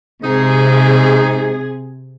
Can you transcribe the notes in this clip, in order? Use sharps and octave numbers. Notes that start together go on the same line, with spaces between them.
G#2 C3 D#4 G#4